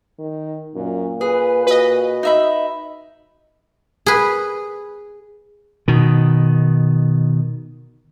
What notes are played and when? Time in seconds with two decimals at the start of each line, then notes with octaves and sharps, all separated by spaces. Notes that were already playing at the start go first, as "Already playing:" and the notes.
0.19 D#3
0.75 F#2 A#2
1.21 G#4 B4
1.67 F#4 B4 D#5
2.23 D#4 E5 B5
4.06 G#4 B4
5.88 B2 D#3